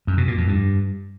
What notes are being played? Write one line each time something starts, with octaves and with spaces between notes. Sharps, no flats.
F#2
B2
A#2
F2
G2